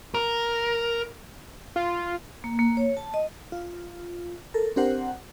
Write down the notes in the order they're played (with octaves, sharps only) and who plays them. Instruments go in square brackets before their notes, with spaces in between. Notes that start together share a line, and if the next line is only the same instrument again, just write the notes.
[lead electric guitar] A#4
[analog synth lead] F4
[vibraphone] A#3
A#3
C#5
A5
D#5
[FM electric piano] F4
A4 A#4
C4 D4 G4 A#4 C5 F#5